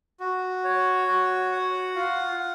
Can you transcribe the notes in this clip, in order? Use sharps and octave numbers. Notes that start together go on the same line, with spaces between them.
F#4
C#5
F#4
F#5
F4
F#5